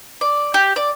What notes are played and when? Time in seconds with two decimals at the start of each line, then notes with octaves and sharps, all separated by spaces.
0.21 D5
0.54 G4
0.76 D5